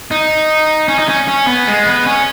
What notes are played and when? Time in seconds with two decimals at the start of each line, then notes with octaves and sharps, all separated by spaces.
0.11 D#4
0.88 C#4
0.99 D#4
1.09 C#4
1.28 C#4
1.47 B3
1.67 G#3
1.86 B3
2.06 C#4